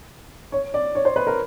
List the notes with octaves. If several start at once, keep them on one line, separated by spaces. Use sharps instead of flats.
C#5
D5
C#5
C5
B4
A#4